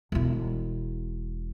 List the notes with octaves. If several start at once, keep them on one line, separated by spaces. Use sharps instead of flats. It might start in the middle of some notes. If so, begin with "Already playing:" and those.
E1 E4